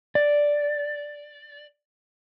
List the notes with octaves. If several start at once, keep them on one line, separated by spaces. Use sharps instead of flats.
D5